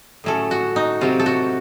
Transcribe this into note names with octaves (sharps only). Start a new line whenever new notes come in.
A2 F#3 A3 C#4 A4
F#4
D#4
C3 F#3 C4 F4
A4
F#4